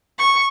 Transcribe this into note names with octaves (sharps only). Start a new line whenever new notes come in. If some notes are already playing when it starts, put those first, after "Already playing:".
C#6